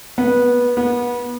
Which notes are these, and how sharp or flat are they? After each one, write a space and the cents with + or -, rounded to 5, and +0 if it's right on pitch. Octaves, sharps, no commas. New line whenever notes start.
B3 -20
B3 -30